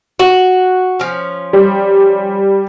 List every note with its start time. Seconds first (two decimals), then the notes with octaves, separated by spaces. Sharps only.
0.19 F#4
0.99 F3 C#4
1.53 G3